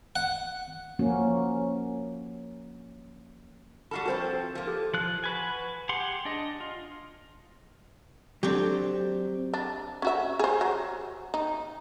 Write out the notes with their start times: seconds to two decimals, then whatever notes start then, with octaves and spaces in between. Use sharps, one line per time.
0.16 F#5
0.99 F3 A#3 C#4 F#4
3.91 G3 F#4 A4 B5 F6 C7
4.06 F3 C4 F#4 A4 A#4 C5
4.55 F3 A#3
4.67 G4 A4
4.94 F3 F#6
5.24 F#4 B4 G#5
5.89 G4 G#4 F#5 C6
6.25 D4 D#5
6.60 F4
8.43 F#3 C4 D4 G4
9.54 D4
10.02 C#4 F#4 E5
10.39 G#4 C5
10.61 F#3
11.34 D#4